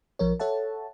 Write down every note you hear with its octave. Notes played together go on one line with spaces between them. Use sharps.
A#1 F3 A#4 C#5
A4 C#5 E5 F#5 A5